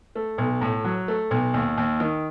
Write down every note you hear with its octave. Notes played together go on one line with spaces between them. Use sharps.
A3
B1
A2
F#3
A3
B1
D#2
D#2
D#3